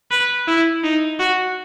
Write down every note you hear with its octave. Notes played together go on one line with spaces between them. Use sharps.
B4
E4
D#4
F#4